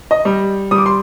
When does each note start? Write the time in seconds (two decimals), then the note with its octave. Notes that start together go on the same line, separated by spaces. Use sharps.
0.11 D#5
0.25 G3
0.71 G3 D#6
0.78 D6
0.86 C6